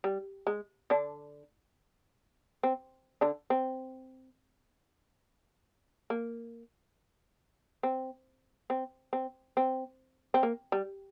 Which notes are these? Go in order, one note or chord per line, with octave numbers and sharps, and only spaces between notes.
G3
G#3
D3 D4
C4
D3 D4
C4
A#3
C4
C4
C4
C4
C4
A#3
G3